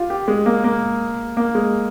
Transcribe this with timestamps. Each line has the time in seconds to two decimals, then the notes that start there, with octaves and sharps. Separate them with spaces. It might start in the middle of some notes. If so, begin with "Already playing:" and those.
Already playing: F4 G4
0.10 G4
0.28 G#3
0.46 A#3
0.64 A#3
1.37 A#3
1.55 G#3